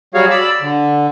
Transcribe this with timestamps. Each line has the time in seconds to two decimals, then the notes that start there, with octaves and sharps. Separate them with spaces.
0.14 F#3 G3 F#4 G#4 C#5 F5
0.30 D5 B5 E6
0.62 D3